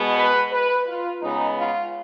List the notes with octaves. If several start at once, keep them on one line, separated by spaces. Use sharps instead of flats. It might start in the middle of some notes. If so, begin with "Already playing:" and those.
Already playing: B2 G#3 B3
B4
B4
F4
C#3 G#3 B3 D#4
F4